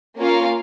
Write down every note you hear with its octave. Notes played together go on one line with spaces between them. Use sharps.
A#3 C#4 F4 A#4 F5